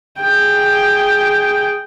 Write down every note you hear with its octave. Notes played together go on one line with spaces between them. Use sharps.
G#4 G5